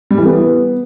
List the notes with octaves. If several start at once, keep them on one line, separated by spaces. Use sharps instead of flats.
G3
E3
B3